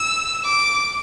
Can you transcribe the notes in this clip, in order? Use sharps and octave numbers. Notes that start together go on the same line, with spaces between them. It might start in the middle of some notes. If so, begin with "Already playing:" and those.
Already playing: E6
D6